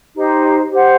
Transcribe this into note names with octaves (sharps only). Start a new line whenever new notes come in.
D#4 G4 C5
G4 C5 F#5